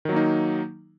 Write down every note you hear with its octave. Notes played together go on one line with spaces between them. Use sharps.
D#3 F#3 A#3 D#4